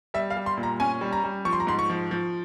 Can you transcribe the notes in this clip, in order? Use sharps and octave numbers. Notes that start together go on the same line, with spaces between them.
G3 E5
F5
G3
C6
A#2
A#5
C#4 G#5
G3
A#5
G3
F3 C#6
C6
A#5
G#2 C6
C#6
F3
F3